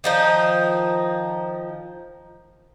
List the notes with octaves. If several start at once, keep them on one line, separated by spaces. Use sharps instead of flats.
D#3 F3 D#4